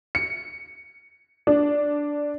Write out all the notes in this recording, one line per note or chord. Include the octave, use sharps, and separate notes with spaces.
C#7
D4